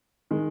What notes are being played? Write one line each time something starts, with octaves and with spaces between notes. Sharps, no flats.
D#3 G#3